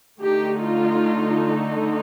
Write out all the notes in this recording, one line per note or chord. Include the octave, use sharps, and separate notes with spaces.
D3 A3 D#4 G4
F4